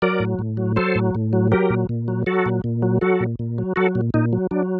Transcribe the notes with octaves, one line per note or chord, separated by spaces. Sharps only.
F#3 A#4 D5
A2
A2
F#3
F#3 A4 C5
A2
A2
F#3
F#3 G4 A#4
A#2
A#2
F#3
F#3 F#4 A4
A#2
A#2
F#3
F#3 F#4 A4
A#2
A#2
F#3
F#3 F#4 A4
A#2
A#2 D#4
F#3
F#3 D4